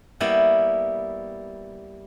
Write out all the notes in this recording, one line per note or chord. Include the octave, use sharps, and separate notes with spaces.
G3 A#3 B3 E4